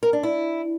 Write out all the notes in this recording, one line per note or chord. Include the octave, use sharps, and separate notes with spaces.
A#4
D4
E4